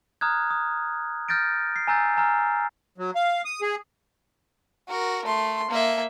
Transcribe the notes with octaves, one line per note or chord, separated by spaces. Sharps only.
A#5 D#6 F6 F#6 G#6
D#6
F6 G6 A6 A#6 D7
C7
G#5 A#5 E6 G6 A6
G#5 A#5 E6 F6
F#3
F5
D#6
G#4
F#4 A#4
A3 C6
A#3 E5